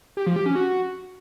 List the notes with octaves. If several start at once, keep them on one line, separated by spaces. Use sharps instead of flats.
G4
F3
G4
C#4
F#4